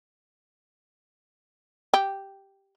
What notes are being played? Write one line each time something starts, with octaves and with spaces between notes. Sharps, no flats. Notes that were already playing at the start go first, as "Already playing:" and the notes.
G4